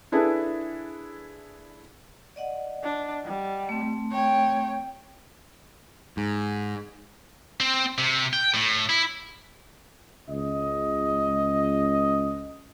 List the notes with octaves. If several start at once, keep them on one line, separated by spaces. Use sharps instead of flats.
D4 E4 G#4 A4 B4
D5 D#5 F#5
D4
G3
A3 C4
C#5 G5
G#2
C4
C3
G5
A2
E4
C#2 D#5